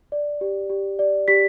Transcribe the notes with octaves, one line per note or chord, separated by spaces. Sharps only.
D5
G4
G4
D5
G4 B6